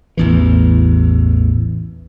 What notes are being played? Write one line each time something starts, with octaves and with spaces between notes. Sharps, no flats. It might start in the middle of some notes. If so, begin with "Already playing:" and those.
A1 E2 E3